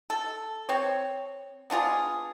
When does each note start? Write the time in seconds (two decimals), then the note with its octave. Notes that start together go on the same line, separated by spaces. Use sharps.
0.10 A4
0.69 C4 C#5
1.70 B3 D4 F4 G#4